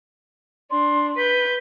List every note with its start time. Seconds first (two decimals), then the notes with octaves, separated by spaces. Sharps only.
0.71 D4 C6
1.17 B4 G6 B6